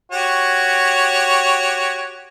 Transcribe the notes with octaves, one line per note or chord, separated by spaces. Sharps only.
F#4 G4 C#5